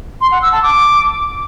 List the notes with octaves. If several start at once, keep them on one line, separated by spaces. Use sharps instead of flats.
C6
F#5
E6
A5
D6